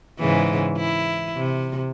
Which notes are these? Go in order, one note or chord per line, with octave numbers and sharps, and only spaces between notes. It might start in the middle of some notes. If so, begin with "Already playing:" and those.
G#2 C#3 E3
E4
C3